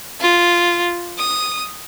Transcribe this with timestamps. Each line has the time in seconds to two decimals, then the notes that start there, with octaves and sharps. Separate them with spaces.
0.21 F4
1.19 D#6